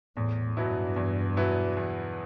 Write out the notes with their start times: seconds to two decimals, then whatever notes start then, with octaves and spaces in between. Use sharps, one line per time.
0.17 E2 A2
0.57 G2 B2 F#3 B3 E4
0.96 E2
1.36 B2 F#3 B3 E4
1.77 E2